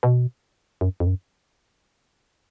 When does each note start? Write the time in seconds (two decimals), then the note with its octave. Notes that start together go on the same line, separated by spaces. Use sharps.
0.03 B2
0.81 F#2
1.00 F2
1.07 F#2